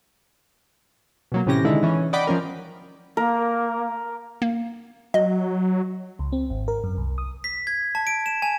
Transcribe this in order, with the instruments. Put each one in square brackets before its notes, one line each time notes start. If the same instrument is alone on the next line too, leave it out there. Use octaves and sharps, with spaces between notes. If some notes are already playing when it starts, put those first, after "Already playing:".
[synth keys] B2 F#3 A#3
A2 C3 E3 C#4 G4 A#6
D3 D#3 G#3 D#4 E4
E3 C#4
D5 D#5 F#5 G5 B5 D6
F3 C#4 A#4
[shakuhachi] A#3 [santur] A#4
[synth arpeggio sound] A#3
[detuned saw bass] F#3 [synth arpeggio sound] D#5
[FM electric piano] C#2
C4
G#1
A#4
F#2
C2
D#6
[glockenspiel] B6
G#6
A5
D7
E7
G#5